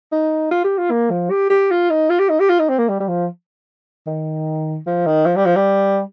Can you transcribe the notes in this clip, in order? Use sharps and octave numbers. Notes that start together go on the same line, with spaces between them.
D#4
F4
G4
F4
A#3
F3
G4
G4
F4
D#4
F4
G4
D#4
G4
F4
D#4
C4
A#3
G3
G3
F3
D#3
F3
D#3
F3
G3
F3
G3